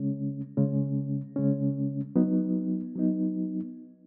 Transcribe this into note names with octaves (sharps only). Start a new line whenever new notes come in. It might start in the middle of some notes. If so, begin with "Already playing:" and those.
Already playing: C#3 G#3 C#4
C#3 G#3 C#4
C#3 G#3 C#4
F#3 B3 D#4
F#3 B3 D#4